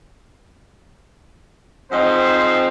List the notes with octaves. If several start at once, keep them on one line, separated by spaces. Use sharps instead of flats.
G#2 F3 C4 D#4 C5